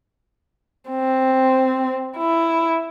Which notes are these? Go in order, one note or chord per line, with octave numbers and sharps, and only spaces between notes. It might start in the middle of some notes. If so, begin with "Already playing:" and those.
C4
E4